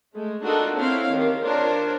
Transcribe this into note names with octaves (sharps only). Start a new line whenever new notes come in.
G#3 A3
D4 D#4 F4 F#4 A4 A#4
C4 E4 C#5 F5
D#3 G4
D4 F4 A#4 C5 C#5